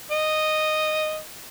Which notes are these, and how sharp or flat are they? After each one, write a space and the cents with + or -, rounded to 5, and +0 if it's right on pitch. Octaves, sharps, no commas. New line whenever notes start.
D#5 -5